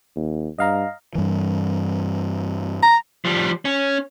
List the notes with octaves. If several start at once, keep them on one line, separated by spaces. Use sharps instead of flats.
D#2
G2 D#5 F5 A#5
G2 E3
A#5
F3 G3
C#4